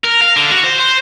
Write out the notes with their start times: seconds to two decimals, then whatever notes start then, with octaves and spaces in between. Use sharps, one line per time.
0.04 A#4
0.21 F5
0.36 D3
0.51 F#4
0.64 C5
0.79 C5